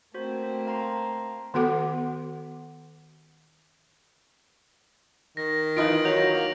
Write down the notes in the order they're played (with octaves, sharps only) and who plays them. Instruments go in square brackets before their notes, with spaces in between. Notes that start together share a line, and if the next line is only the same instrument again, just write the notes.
[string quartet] A3 A#3 C4 [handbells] F#4 C5
[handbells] F5 A#5 C6
[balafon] D#3 B3 F#4 A4 F#5 D6
[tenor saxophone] D#3 [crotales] A#6
[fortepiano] E3 D#4 F4 [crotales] D7 F#7
[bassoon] F#3 [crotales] G6 A#6 F7
[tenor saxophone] A#3